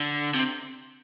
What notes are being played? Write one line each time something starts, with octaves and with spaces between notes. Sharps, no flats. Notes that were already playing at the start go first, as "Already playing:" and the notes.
Already playing: D3
C3